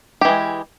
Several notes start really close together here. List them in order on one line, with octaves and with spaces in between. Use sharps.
G4 E3 G#3